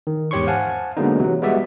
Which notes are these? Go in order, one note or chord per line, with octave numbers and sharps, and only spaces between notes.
D#3
E2 G#2 G4 C#5 C6 C#6
C5 F5 F#5 G#5 A5
D3 F#3 G#3 A#3 B3 D#4
C3 E3 F#3
G3 G#3 B3 F#4 D5 E5